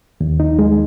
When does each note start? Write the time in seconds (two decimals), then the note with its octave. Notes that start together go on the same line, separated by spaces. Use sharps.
0.21 D#2
0.40 D#4
0.59 G#3